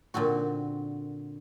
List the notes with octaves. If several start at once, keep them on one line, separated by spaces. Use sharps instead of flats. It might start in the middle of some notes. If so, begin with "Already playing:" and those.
A#2 D3 C4 F#4